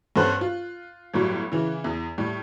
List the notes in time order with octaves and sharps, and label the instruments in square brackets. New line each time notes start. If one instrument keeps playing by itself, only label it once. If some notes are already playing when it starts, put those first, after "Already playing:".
[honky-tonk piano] G2 B3 C#4 A4 C5 F#6
F4
G1 A2 F#3 G3
C#3 E3
E2
A2 G3